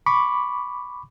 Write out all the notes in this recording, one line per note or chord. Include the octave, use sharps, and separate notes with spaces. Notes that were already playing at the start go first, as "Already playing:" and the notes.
B5 C#6 D6